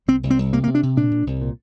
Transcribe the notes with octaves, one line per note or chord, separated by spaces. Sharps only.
C2 C4
C2
C4
C2
C3 A#3
A#3
C3
D4
C3
A#2 D4
A#2
C2
A#2